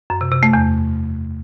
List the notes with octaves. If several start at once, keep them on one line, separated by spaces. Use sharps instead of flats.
F#2
C3
C3
A3
E2